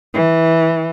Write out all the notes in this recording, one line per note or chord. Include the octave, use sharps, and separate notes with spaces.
E3